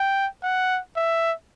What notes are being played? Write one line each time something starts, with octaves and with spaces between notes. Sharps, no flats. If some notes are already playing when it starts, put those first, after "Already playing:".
Already playing: G5
F#5
E5